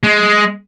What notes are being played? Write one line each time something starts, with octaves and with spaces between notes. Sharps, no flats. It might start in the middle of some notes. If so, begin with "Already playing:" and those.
G#3